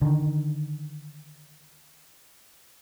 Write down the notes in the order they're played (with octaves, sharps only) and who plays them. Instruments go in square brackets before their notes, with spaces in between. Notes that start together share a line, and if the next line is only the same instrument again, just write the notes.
[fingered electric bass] D3 D#3